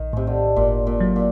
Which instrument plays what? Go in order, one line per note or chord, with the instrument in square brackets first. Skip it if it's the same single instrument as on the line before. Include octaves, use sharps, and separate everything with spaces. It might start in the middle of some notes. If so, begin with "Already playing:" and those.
Already playing: [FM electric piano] A#1 [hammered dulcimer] D#3
[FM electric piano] A2 [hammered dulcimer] C3
[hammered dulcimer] D3
[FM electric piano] G1 [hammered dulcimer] A#2
[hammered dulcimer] A#2
[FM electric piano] F#3
[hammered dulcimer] A#2